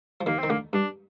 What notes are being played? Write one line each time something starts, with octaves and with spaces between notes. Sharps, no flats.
F3
D#2 D#3 A#3
D#3 C4
D2 D3 A#3
G2 D4